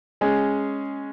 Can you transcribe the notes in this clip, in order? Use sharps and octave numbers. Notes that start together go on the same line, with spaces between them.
G#3 C#4 G#4